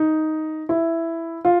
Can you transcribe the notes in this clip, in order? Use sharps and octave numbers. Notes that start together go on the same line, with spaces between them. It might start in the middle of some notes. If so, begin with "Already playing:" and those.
Already playing: D#4
E4
F4